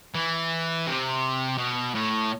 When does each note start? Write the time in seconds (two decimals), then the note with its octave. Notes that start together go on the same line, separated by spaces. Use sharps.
0.15 E3
0.87 C3
1.58 B2
1.95 A2